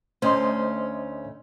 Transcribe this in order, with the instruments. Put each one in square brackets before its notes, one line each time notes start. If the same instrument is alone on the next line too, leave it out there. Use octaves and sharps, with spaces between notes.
[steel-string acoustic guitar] D2 A3 C#4 [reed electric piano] C5 D#5 C6